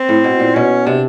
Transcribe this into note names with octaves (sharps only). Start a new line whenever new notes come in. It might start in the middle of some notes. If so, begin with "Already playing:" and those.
Already playing: C4
A2
B2
A#2
B2 C#4
C3 D4